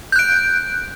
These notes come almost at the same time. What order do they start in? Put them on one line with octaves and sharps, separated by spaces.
G6 F#6 D7